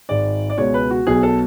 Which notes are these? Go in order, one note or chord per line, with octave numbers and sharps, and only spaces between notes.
G#1 G#2 G#3 D5
D5
C#2 B2 G#3 C#5
B4
F#4
B1 B2 F#3 G#4
A4